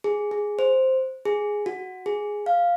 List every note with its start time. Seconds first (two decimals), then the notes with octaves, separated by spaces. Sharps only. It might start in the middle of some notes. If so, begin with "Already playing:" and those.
0.04 G#4
0.31 G#4
0.59 C5
1.25 G#4
1.66 F#4
2.06 G#4
2.46 F5